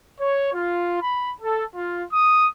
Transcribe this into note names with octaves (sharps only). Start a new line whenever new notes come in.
C#5
F4
B5
A4
F4
D#6